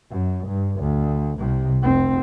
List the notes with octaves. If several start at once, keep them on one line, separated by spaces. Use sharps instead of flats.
F#2
G2
D2
C2 C3
F1 C4